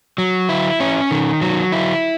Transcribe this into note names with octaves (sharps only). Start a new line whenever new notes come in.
F#3
E4
C#4
D#3
F#3
E4